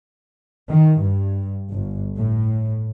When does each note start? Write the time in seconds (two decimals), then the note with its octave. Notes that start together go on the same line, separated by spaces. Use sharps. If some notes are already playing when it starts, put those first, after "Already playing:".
0.70 D#3
1.01 G2
1.71 G1
2.18 A2